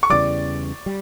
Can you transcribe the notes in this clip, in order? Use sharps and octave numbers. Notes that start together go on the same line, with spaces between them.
C#6
E2 C#3 E3 G3 D5 D6
G3